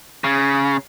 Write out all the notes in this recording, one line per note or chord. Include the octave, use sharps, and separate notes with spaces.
C#3